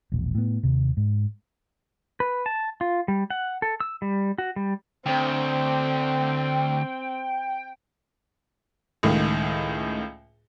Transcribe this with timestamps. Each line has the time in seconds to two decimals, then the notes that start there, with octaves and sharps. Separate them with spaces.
0.12 E1 A#1
0.35 A2 B3
0.63 D#2 C3
0.97 G#2
2.20 B4
2.46 A5
2.81 F4
3.08 G3
3.30 F#5
3.62 A4
3.80 E6
4.02 G3
4.38 F#4
4.56 G3
5.06 D2 C4 G5
9.03 C#2 A2 D#3